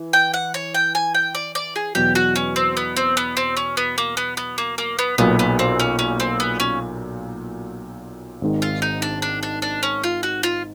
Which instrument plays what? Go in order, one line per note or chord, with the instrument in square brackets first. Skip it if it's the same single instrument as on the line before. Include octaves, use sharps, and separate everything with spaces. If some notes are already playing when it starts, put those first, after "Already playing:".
Already playing: [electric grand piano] E3
[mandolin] G5
F#5
C#5
G5
G#5
G5
D5
D5
G#4
[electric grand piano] E2 B2 F#3 [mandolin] G4
[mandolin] F#4
C#4
C4
B3
C4
B3
C4
C#4
B3
A#3
B3
B3
A#3
A#3
B3
[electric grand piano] B1 A#2 F#3 [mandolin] B3
[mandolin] B3
C4
C#4
C#4
C4
B3
C#4
[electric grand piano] G#1 G#2 D#3
[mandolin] F4
D#4
D4
D4
D4
D4
C#4
F4
F#4
F4